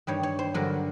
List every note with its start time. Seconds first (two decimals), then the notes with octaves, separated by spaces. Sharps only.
0.07 G2 D#3 G3 C#5
0.23 C#5
0.39 C5
0.54 G2 D3 F#3 A#4